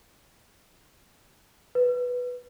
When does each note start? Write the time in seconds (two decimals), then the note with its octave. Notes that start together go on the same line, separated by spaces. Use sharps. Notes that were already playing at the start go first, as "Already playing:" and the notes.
1.75 B4